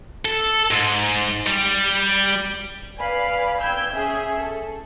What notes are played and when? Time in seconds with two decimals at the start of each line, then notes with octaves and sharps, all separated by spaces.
0.25 A4
0.71 G#2
1.47 G3
2.99 B4 D5 F5 G#5 B5
3.60 G5 E6 G6 G#6
3.93 C#4 G#4 E5
4.40 A4